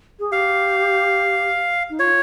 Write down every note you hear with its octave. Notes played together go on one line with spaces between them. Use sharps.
G#4
G4 F5
D#4
F4 C#5